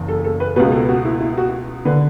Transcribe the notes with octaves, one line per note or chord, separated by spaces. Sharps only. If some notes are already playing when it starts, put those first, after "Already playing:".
Already playing: F#1 E2 C#3
A4
A4
B4
C#2 B2 B4
A4
F#4
E4
E4
F#4
D3 B4